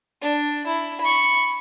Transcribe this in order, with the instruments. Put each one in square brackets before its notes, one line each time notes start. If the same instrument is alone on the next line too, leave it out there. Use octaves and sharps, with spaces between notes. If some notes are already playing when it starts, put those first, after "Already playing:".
[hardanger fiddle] D4
E4
B5 C#6